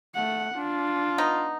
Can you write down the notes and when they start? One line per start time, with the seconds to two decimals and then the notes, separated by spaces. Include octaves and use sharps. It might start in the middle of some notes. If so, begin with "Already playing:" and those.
0.15 A3 F#5
0.55 D4 F4
1.18 B3 D#4